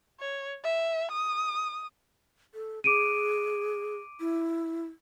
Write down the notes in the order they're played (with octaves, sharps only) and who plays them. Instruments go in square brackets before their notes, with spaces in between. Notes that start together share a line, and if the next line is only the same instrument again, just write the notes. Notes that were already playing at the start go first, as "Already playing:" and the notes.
[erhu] C#5
E5
D#6
[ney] A4
[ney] G#4 [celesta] D6 D7 D#7
[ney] E4